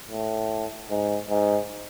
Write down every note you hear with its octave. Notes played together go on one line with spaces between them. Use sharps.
A2
G#2
G#2